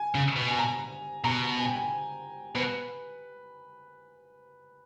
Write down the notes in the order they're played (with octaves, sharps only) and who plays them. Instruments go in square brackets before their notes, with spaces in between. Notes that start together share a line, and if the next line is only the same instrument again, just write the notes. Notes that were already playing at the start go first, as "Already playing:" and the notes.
Already playing: [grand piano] G#5
[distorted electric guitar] C#3
B2
[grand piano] G#5
A#5
[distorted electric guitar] B2 [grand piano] A#5
[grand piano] G#5
G5
G#5
[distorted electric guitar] B2 [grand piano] B4